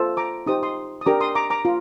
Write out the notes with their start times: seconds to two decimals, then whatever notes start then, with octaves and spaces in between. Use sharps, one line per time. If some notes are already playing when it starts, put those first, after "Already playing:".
Already playing: F4 A4 C5
0.17 A#5 D6
0.47 D#4 G4 C5 D#6
0.63 C6 D#6
1.01 D#6
1.06 D4 G4 A#4 A#5 D6
1.21 C6 D#6
1.35 A#5 D6
1.50 A#5 D6
1.65 F4